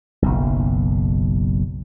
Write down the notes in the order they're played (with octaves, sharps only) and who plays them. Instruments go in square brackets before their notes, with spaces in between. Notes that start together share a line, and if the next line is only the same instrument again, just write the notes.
[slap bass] F#1 B1